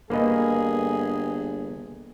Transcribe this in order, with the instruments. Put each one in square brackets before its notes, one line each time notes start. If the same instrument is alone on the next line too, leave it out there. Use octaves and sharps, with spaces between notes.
[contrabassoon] G1 [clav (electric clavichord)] A#3 B4 D#5 [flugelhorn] G#4